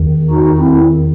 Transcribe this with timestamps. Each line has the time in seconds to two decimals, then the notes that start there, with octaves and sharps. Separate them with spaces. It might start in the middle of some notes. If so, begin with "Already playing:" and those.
Already playing: E2 D#3
0.30 D#4 F#4
0.58 C4 E4